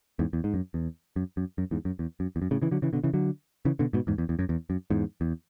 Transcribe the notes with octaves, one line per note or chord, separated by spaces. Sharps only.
E2 G#2
E2
G#2
F#2
E2
F#2
F#2
F#2
E2 G#2
F#2
E2
F#2
E2
F#2
A2 C#3
C#3 E3
D3 F#3
C#3 E3
B2 D3
C#3 E3
D3 F#3
C#3 E3
B2 D3
G#2 B2
E2 G#2
E2
E2
F#2
E2
F#2
E2 G#2
E2